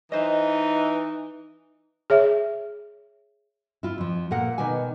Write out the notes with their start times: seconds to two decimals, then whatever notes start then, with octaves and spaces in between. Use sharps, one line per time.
0.12 E3 D#4 C5 D#5
2.10 G#4 C#5 E5
3.83 E4 F4
3.98 F2 F3
4.31 A#2 A#3 A4 A#4 F#5
4.58 B2 D#3 B4 D5 G#5